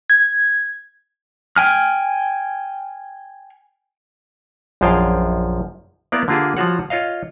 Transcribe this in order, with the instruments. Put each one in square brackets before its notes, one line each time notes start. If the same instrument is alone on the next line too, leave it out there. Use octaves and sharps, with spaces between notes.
[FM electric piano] G#6
[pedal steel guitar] G5 G#5 F6
[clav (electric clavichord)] A#1 F#2 F3 G#4 F5 G5
A#3 B3 E4 D5 F5
D3 A#3 F4 G4 G#4
F3 G3 F4 F#4 C#5 F#5
F4 C#5 D#5 F5